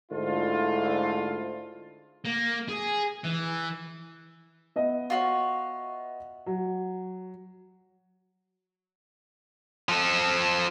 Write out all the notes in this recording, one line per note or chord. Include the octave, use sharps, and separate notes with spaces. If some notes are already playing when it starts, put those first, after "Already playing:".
G#2 D3 A3 E4 F4
A#3
G#4
E3
B3 D#5 E5
F4 F#4 C#5
F#3
F3 A4